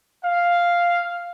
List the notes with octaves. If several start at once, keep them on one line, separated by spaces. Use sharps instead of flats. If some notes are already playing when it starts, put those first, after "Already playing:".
F5